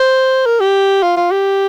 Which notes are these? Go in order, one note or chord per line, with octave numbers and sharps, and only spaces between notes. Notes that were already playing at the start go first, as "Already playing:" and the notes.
Already playing: C5
A#4
G4
F4
F4
G4